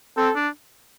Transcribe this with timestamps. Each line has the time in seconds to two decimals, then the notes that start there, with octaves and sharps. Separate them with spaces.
0.17 C4 A4
0.35 D4